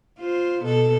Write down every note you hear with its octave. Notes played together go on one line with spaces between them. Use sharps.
F4 C5
B2 A4